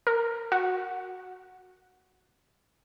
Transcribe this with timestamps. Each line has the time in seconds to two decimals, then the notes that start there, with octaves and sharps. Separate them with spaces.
0.07 A#4
0.52 F#4